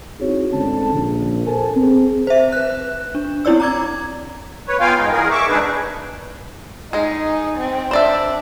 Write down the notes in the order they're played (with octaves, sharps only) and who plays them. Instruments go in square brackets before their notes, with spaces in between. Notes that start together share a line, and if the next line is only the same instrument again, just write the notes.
[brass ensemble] C4 D#4 E4 F#4 G#4 C#5
D2 G#2 D3 C4 C#4 A5
A#1
A4 A#4 C5 G#5 A5
C4 G#4
[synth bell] C5 E5
B4 F#6
D4
C4 D4 E4 C#5 D5 E6
A#5 D6 G#6
[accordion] B4 C#5
B3 F4 F5 G5 G#5
G#2 D#4
E2 G#4 A#4
E5 C#6 D6
G#2 D4 D#4 G#4 B4
[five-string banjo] G#3 G#4 [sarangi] D#4
[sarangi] C4
[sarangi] D4 [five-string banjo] C5 D5 E5